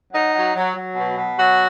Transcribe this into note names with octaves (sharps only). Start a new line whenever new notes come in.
F#3 D#4
F#3
F#3
F#3
B2
B2
F#3 F#4